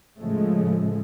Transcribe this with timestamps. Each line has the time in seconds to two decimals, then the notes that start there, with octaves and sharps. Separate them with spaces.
0.21 A2 C#3 F3 G#3 A3